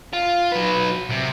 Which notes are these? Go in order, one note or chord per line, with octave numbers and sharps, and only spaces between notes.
F4
F#3 B4
C2 C3